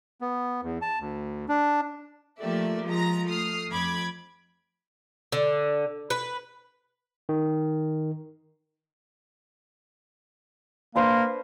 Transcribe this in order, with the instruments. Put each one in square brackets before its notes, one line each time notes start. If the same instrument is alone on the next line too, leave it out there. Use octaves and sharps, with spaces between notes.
[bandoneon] B3
E2
A5
D2
D4
[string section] F3 A3 A#3 G4 D5 E5
F3 G#3 A#5 A#6
A3 D#6 F6 C7
F2 B5 D6 G#6
[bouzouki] D3
B4
[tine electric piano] D#3
[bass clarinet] A#3 [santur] D4 B4 C5